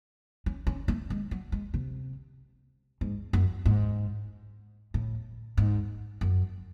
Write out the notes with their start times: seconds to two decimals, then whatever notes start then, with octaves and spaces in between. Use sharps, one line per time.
0.46 C#4
0.67 C#4
0.88 A3
1.10 G#3
1.31 F#3
1.52 G#3
1.74 C3
3.01 G#2
3.33 F#2
3.66 G#2
4.94 A2
5.57 G#2
6.21 F#2